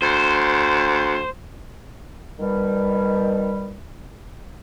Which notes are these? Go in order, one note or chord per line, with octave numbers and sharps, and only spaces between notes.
D2 C5
B2 D#3 G3